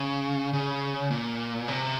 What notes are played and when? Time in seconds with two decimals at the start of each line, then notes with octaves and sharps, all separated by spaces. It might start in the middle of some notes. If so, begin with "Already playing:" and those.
Already playing: C#3
0.53 C#3
1.11 A#2
1.68 C3